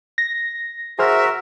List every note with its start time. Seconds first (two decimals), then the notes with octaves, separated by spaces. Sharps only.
0.18 A#6
0.99 F#4 G#4 A#4 C5 E5 F6